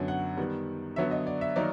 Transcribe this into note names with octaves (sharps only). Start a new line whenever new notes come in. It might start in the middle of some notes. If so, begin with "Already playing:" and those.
Already playing: F#2 D3 F#3 B3
F#5
D#3 G3 B3
D3 F#3 B3 E5
D#5
D5
E5
D#3 F#3 A#3 D#4 D5